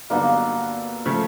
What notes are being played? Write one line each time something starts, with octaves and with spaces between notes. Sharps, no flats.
G2 D3 F#3 A#3 B3 D#4
C#3 F3 A3